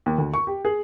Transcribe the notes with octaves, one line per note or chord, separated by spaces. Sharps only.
D#2
D2
C#6
G4
G#4